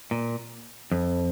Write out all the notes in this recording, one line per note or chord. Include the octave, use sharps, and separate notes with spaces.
A#2
F2